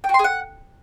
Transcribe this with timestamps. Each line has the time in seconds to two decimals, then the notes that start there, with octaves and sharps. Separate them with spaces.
0.04 G5
0.09 F#4
0.14 C6
0.19 G#4
0.24 F#5